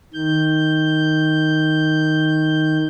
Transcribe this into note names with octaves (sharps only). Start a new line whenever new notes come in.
D#3 G6